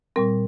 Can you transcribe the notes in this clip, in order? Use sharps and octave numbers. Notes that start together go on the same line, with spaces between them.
A#2 G3 C4 A#4